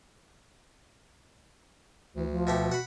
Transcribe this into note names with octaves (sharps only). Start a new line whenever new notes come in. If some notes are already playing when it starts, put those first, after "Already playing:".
D2 E3
F3
B2 A3 G4
F#4 F#5 B5